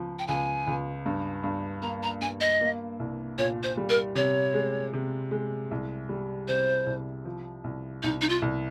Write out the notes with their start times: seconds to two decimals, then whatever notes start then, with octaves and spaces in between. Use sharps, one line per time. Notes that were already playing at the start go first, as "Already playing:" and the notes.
Already playing: C#2 F3
0.19 G5
0.27 C#2 G#5
0.67 C#2
1.06 G2
1.44 G2
1.82 A#3 A#5
2.03 A#5
2.21 G2 G#5
2.41 D#5
2.61 A#3
3.00 C2
3.38 A#2 C#5
3.63 C5
3.77 G3
3.89 A#4
4.15 C3 C#5
4.54 G#3
4.93 C3
5.31 G#3
5.71 C2
6.09 G3
6.48 C3 C5
6.86 C2
7.25 F3
7.64 C2
8.03 C2 D#4
8.21 D#4
8.29 F4
8.42 C2